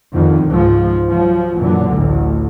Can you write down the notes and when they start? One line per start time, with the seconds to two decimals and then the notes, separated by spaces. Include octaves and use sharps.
0.13 F2 D3 D#3
0.45 C#2 G#2 F3
1.11 F3 F#3
1.58 F#2 A#2 D3 E3 F#3
1.93 A1 D2